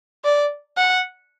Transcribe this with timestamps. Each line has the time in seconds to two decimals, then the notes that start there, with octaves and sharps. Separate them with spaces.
0.24 D5
0.77 F#5